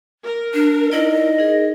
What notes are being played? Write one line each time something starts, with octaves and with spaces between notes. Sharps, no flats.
A#4
D4
D#4 E4 D5 D#5
D#4 G#4 A#4